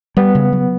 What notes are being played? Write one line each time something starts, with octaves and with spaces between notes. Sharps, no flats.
G3 B3
C#3
F#3